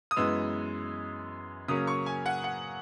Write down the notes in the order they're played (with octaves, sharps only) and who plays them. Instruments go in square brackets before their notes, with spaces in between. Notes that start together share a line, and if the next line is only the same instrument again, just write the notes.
[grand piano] D#6
F#2 E3 G#3 B3 E6
C#3 F#3 A#3 C#4 D#6
C#6
G#5
F#5
F#5